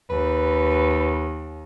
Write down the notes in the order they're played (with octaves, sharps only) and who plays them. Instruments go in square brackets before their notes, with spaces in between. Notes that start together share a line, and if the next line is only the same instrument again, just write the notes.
[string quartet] D#2 [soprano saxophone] B4